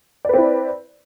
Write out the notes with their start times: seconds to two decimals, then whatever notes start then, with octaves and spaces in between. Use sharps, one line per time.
0.25 D5
0.29 B4
0.34 C4
0.38 E4